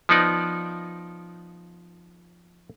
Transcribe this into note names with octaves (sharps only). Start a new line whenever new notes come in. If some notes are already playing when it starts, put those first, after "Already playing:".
F3 B3 D#4 D5